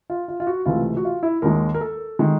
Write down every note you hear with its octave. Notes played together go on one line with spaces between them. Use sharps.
F4
F4
F4
F#4
C#2 C3 E3 A3 F4
F#4
F4
E4
D#2 D#3 G#3 A#4
A#4
A4
D#3 G#3